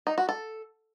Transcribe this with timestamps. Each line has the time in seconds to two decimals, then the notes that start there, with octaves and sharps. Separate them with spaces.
0.07 D#4
0.18 F#4
0.29 A4